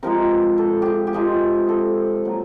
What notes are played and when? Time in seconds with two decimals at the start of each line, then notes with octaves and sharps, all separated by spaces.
0.03 C3 F3 G#3 A#4
0.58 A4
0.82 G4 G#4
1.07 G4
1.13 C3 F3 G#3 G#4
1.69 A4
2.25 A#2 F#3